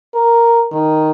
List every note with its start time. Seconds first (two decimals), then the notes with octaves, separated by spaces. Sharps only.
0.14 A#4
0.72 D#3